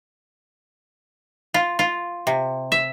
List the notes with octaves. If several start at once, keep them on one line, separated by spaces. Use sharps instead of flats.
F4
F4
C3
E5